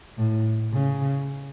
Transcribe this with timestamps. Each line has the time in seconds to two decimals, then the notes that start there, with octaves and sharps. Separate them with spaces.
0.18 A2
0.73 C#3